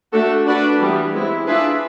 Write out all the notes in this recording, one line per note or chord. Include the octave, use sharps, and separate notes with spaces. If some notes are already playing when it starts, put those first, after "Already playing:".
A3 D4 F#4 A4
D4 F#4 B4 D5
E3 G3 B3
G#3 C4 E4
D4 F4 G#4 B4 E5